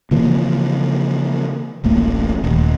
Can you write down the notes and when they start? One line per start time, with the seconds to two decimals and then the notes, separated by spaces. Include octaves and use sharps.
0.11 C#3 E3 F3 A#3
1.84 D1 A1 A3 A#3
2.44 D#1